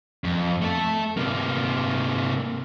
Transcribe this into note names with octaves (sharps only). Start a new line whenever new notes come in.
F2
A3 A4
C3 A#3